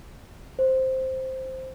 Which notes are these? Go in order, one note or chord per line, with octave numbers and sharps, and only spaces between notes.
C5